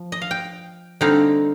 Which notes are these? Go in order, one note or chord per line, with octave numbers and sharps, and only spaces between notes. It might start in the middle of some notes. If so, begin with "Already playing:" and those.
Already playing: F3
D#5
F5
G5
D3 G3 C4 D#4 F5